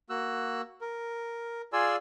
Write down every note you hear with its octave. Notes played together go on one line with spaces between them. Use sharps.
A#3 F#4 E6 F#6
A#4
F4 G#4 D5 G#5 C6 E6